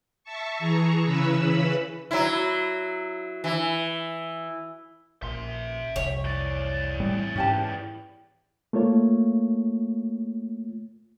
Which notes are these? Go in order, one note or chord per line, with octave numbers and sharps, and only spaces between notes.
E5 A5 C#6
E3 G#4 A#5 C#6
C#3 E3 C#4 B4 B5 E6
F#3 E4
E3
A#1 E5 C6
F1 C2 C#5
E3 D5
A2 G3 C4
G#2 C#4 G4 A5
A3 A#3 F4 C#5